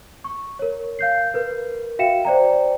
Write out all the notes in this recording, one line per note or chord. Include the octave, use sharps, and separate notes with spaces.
C#6
A#4 C#5
F5 G6 C7
A#4 B4
F#4 E5 F5 G5 C#7 E7
C5 D5 G5 A#5